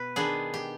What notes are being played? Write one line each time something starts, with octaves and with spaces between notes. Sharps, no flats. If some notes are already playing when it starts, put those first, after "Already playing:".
Already playing: B2 B4
D#3 B3 D4 G#4
G4